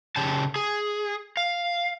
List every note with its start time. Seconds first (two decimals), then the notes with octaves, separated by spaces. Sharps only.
0.16 C#3 G4 A5
0.56 G#4
1.37 F5